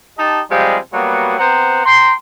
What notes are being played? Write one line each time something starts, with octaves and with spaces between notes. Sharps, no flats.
D#4 G4 D#5 A5
C3 F3 G3 G#3 F5
F#3 G3 A#3 B3 F#4
B3 C4 C5 F#5 A#5
G5 A#5 C6